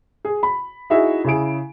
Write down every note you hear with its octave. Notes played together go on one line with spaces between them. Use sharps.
G#4
B5
D#4 E4 F#4 G#4 E5
C#3 E4 G#4 D7